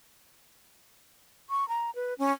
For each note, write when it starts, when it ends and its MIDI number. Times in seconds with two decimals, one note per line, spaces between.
1.50 1.67 85
1.68 1.90 82
1.95 2.14 71
2.18 2.32 61